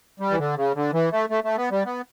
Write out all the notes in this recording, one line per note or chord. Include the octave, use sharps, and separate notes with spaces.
G3
E3
D3
C#3
D3
E3
A3
A3
A3
B3
G3
B3